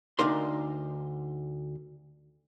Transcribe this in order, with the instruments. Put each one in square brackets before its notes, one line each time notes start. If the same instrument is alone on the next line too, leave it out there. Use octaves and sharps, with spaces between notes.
[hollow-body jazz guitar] D2 D4 D#4 A#4 C6